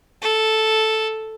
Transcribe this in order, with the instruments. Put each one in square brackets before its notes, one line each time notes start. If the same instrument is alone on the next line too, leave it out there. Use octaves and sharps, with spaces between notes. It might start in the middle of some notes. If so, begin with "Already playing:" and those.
[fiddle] A4